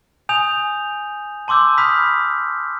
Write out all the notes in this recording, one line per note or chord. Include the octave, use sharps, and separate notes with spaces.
G#5 D#6 G6 F7
A5 C6 D6 E6 G6
B5 D#6 F6 G6 B6